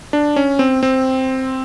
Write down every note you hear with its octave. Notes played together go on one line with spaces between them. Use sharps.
D4
C#4
C4
C4